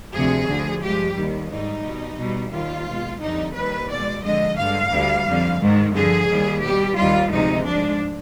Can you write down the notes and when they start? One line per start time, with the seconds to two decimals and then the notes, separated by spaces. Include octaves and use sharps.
0.13 D2 C3 F3 G#4
0.48 D2 D3 F3
0.82 G2 F3 G#3 G4
1.16 D#2 D#3 G3
1.50 G#2 G3 D#4
1.84 B2 G3
2.18 B2 G3
2.52 D#2 D#3 G3 F4
2.87 B2 G#3
3.21 F2 D3 G3 D#4
3.55 D#2 D#3 G3 B4
3.89 B2 G#3 D5
4.23 F2 D3 G#3 D#5
4.58 G2 D3 G#3 F5
4.91 D2 D3 G3
5.26 F2 D3 G3
5.60 G#2 D#3 G#3
5.94 G2 D3 F3 G#4
6.29 D#2 D#3 G3
6.62 B2 G3 G4
6.96 D#2 D#3 G3 F4
7.31 D2 C3 F3 G#3 D#4
7.65 G#2 F3 G#3 D4